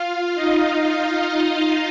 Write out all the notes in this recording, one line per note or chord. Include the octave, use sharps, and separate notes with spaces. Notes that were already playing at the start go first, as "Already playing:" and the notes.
Already playing: F4 F5
D#4 D#5